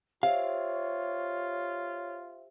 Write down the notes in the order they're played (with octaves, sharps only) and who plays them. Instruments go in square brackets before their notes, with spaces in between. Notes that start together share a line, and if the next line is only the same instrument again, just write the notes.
[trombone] F4 [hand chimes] G4 C5 E5 [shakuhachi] C#5 [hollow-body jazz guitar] F5